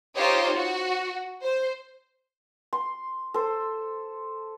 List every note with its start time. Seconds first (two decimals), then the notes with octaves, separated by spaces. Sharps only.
0.15 D#4 F4 G4 C5 C#5 D#5
0.56 F#4
1.43 C5
2.73 C6
3.34 A4 C5